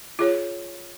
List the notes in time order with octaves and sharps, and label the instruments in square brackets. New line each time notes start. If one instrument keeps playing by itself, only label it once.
[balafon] F4 G#4 C#5